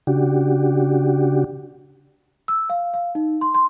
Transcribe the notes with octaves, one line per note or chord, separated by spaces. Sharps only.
C#3 D4 F#4 G4
E6
F5
F5
D#4
C6
C6